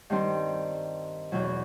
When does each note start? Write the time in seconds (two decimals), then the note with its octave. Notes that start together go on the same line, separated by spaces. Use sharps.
0.10 G2 D#3 G3 C4
1.32 E2 B2 F#3